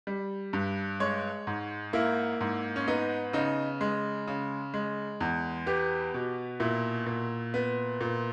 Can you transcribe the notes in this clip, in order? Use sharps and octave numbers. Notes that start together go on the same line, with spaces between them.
G3
G2
G#3 C#5
G#2
A#3 E4
G#2
C#4
B3 D#4
C#3 D#4
G#3
C#3
G#3
E2
B3 G4
B2
A#2 E4
A#2
B3
A#2